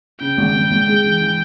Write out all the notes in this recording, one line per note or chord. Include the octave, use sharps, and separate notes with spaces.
C#3 G5
G#1
G#1
G#1
G#3
E3
E3